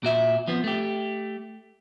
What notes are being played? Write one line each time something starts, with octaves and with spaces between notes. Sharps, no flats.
A#2 F#4 E5
F3 B3 C4
A3 G4